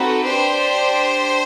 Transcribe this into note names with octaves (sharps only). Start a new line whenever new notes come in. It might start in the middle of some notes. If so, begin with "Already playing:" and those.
Already playing: C4 D#4 F#4 A4 B4
D4 G4 C5